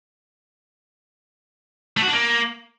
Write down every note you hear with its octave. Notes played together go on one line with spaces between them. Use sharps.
A3
F#4
D4
A#3